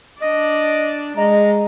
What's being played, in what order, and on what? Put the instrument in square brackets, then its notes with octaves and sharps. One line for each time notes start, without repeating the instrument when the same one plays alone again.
[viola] D4 D5 [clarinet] D#5
[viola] G#3 [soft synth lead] D#5 [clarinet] A#5